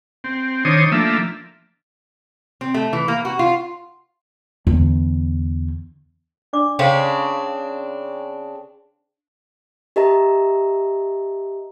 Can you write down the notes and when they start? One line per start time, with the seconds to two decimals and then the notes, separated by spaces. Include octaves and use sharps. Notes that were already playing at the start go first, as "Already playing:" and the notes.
0.24 C4
0.65 D#3 D4 C5 C#5 D#6
0.92 F3 A3 A#3 D4 E5
2.61 C4
2.74 A3
2.93 E3
3.08 A#3
3.25 F#4
3.39 F4
4.67 E2 D3
6.53 D4 D5 D6
6.79 C#3 C4 D4 C5 F5 G5
9.96 G4 A#4 D#5 E5 A5 A#5